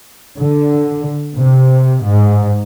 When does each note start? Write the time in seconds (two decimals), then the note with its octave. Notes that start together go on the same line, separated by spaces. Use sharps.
0.39 D3
1.37 C3
2.04 G#2